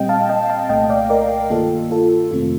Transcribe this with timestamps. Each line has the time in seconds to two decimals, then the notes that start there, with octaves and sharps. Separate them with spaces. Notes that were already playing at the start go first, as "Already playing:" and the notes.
Already playing: A#2 G3 C4 D#5 G5
0.09 F5 A5
0.29 D#5 G5
0.50 F5 A5
0.69 C2 A#2 A3 D#5 G5
0.90 D5 F5
1.09 A#4 D5
1.50 G2 D#3 A#3 F4 A4
1.91 F4 A4
2.31 F2 C3 D#3 A3 C4 F4